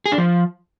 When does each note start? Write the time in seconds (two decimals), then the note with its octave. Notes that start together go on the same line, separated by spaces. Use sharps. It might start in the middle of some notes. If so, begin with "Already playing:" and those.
0.06 G#4
0.12 D4
0.18 F3